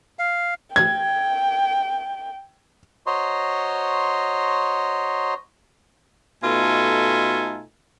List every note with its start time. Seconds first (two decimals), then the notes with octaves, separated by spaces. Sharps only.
0.19 F5
0.76 G5 G#6
3.07 F#4 C5 C#5 D#5 A#5 C6
6.43 B2 A3 D#4 F4 A4 G#5